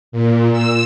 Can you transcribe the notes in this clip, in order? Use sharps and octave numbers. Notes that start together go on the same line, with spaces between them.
A#2
E6